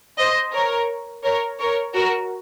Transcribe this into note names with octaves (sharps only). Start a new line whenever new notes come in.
C5 D#5
A#4 C#5
A#4 C#5
A#4 C#5
F#4 A#4